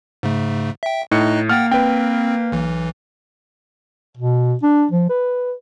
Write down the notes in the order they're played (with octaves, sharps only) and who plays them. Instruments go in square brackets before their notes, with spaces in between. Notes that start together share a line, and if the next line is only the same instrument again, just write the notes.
[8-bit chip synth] G#2 C#3 A3
E5 G5
[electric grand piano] A2 C#7 [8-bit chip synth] D#4 D#5 F#6
[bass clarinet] A#3 [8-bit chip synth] F#5 G5 [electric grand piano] F6 A6
[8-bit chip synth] C4 [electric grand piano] B4 G5
[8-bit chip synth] B1 E3
[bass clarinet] B2
D4
F3
B4